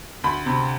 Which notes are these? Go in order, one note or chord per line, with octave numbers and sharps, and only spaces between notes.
D2 B5
C3